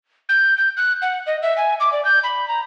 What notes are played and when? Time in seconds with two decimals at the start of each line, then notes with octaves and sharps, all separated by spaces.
0.29 G6
0.57 G6
0.77 F#6
1.02 F#5
1.27 D#5
1.42 E5
1.58 G#5
1.80 D6
1.92 D5
2.05 G6
2.23 B5
2.48 A#5